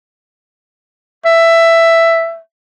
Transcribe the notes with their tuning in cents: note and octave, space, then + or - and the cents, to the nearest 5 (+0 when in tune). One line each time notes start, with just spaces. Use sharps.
E5 +10